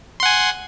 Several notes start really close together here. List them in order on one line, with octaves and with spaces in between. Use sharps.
C6 F#5 G#5